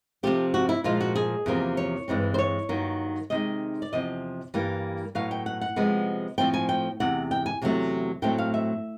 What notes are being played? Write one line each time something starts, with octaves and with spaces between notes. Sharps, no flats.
C3 F3 A3 C4 G4
F#4
E4
A#2 F3 G#3 F4
F#4
G#4
E2 C3 F3 A#3
C#5
G2 E3 G#3 C4
C5
C#5
G2 D#3 F#3 A#3
C3 D#3 G#3 D#5
D5
E2 C3 F3 D#5
G2 E3 G3 A#3
A2 F#3 B3 F5
G5
F#5
F#5
C3 F3 G#3 B3
A2 F3 A3 C4 G5
G#5
G5
E2 C3 F#5
G5
G#5
E2 C3 D#3 F#3 A3
A2 F#3 A3 C4 G5
F5
E5